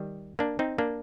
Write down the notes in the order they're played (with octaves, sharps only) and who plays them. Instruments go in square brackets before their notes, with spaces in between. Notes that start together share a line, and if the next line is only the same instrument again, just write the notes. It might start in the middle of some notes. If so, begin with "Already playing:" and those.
Already playing: [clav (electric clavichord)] D#3 G3
A#3 D4
C4 D#4
A#3 D4